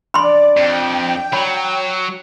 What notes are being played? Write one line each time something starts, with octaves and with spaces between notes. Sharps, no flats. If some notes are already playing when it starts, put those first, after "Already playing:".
D4 D5 B5 C6
F2 G5
F#3 C#5 B5